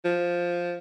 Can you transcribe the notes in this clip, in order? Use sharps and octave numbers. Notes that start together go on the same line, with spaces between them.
F3